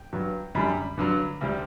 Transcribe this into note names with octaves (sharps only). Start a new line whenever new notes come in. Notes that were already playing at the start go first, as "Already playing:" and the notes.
Already playing: G5
G2 F#3
F#2 D3 G3 B5
G2 D3 F#3
D2 D3 G3